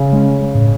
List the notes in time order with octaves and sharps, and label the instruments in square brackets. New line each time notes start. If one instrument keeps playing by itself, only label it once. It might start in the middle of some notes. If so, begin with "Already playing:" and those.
Already playing: [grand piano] C#3
[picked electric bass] G#3 C#4
A2